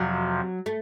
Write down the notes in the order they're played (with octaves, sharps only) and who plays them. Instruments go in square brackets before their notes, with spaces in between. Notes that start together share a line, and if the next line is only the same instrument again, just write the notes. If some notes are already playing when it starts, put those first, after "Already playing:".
Already playing: [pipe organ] F2 C3 F3 [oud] F#3
[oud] A3